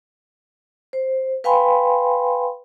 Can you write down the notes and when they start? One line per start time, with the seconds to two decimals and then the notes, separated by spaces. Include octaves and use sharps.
0.93 C5
1.44 B4 F5 G5 G#5 B5 C6